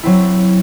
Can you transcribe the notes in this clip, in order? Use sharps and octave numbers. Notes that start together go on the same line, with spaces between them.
F#3 C4 E4